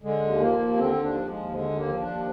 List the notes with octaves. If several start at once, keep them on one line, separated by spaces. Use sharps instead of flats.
D3 G#3
D#2
F3 A#3
D#2
D3 C4
D#2
D4
F3
G#3
D#2
D3 G#3
D#2
A#3
F3
D4
D#2